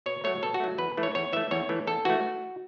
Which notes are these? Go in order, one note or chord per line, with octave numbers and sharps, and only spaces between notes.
B2 C#5
F#3 A3 C#5
B2 A4
F#4
F#3 A3
E2 B4
E3 A3
C#5
E2 C#5
E3 A3 E5
E2 C#5
E3 A3
E2 A4
E3 A3 F#4